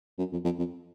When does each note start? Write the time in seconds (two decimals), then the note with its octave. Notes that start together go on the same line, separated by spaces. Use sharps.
0.18 F#2
0.32 F2
0.44 F2
0.58 F2